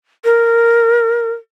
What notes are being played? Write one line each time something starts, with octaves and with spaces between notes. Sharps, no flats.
A#4